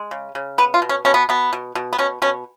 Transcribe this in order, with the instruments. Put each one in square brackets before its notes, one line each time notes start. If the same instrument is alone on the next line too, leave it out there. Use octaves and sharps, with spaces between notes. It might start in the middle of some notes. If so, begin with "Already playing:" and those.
Already playing: [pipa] G#3
C#3
C#3
B3 B4
F4
B2
C#4
B2 C#4
B3
B2 B3
B2
B2
B3
B2 C#4
B2 C#4